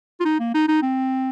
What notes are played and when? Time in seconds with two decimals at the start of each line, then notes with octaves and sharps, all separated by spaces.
0.20 F4
0.25 D#4
0.39 A#3
0.54 D#4
0.68 D#4
0.82 C4